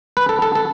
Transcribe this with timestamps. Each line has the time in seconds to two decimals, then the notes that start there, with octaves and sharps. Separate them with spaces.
0.17 B4
0.29 A4
0.42 A4
0.55 A4